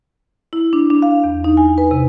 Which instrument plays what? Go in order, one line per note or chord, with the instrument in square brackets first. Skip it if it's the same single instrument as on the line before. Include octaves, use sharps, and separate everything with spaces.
[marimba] E4
D4
D4
F5
E2
D#4
G#5
B4
C3